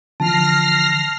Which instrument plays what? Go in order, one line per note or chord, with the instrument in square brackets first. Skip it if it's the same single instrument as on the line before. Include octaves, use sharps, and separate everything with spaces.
[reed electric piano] D3 E3 F3 [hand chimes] A5 [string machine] F6 A#6 C7